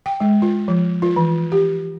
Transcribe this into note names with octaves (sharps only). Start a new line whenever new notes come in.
G5
G#3
F4
F3
F4
E3
G4